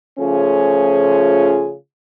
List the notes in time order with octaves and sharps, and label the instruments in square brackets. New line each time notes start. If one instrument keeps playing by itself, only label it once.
[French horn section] C#3 F3 A3 C#4 F4 G#4